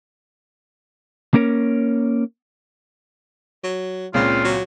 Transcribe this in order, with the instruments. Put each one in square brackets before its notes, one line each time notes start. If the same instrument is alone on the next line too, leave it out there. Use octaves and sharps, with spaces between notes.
[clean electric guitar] A#3 C#4 A#4 C#5
[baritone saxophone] F#3
[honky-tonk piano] C#2 A#2 C4 [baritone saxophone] C#3 [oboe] F4
[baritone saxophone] F#3